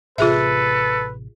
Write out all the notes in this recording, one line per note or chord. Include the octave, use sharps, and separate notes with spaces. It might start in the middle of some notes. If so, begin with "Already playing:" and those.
A1 C3 F4 G#4 A4 B4 E5